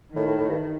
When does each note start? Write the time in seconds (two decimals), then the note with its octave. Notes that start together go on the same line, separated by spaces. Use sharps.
0.14 A2 D#3
0.27 A2
0.38 A2
0.49 G2